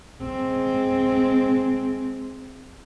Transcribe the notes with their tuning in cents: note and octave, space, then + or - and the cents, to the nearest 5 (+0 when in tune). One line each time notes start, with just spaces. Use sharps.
G#3 +5 C4 +0